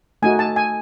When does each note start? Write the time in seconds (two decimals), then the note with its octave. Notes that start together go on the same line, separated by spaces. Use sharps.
0.22 A3 D#4 F#4 G#5
0.39 A5
0.56 G#5